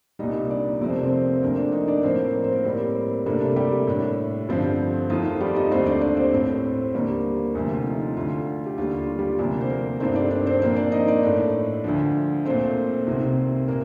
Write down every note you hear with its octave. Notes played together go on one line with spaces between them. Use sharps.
C2 A#2 G3 D#4 D#5
D4 D5
F2 C3 F3 A3 C4 D5
C5
A#4
C4 C5
D2 D3 F3 A3 A#3 A#4
D4 D5
D#4 D#5
D4 D5
A2 F3 A#3 C4 C5
A#4
C5
A#3 A#4
A2 G3 C4
C3 G3 A3 A#3 D4 A4
A3 A4
G3 G4
A2 A3 D4
G2 D3 F3 C4
F2 D#3 A3 F4
F4
G3 G4
D#4 D#5
D#2 D3 A3 C4 D4 C5
D4 D5
D4 D5
C4 C5
A2 A3 C4
D#2 D3 G3 A#3
D2 C3 F3 A3 A4
F4
D#4
F4
D2 D3 A3 F4
G4
D#2 D3 G3 F4
F4
G3 G4
D2 C3 F3 A#3 D4 A#4
C5
A#3 A#4
G2 D#3 A3 C4 D4 C5
D4 D5
D4 D5
C4 C5
A#2 F3 A#3 C4 D4 C5
D4 D5
D#4 D#5
D4 D5
A2 A3 D4
D2 D3 F3
A#2 A3 C4 C5
C2 C3 D#3
A#2 A#3 A#4